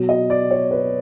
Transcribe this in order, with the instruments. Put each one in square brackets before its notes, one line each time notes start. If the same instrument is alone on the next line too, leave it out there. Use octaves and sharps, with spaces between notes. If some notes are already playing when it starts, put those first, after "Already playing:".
Already playing: [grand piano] B2 F#3
D#5
D5
C#5
B4